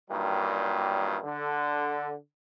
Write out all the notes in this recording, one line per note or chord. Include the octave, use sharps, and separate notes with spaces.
G2 A#2 D#3 F#3 G3
D3